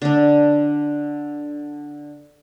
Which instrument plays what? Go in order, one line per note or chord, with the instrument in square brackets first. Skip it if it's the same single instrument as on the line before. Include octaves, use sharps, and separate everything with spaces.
[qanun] D3 D4